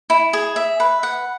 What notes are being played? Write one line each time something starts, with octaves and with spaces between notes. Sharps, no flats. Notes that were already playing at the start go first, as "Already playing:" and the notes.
E4
G#4
E5
B4
F#5